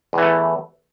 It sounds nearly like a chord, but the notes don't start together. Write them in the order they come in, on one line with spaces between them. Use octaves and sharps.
E2 E3 A3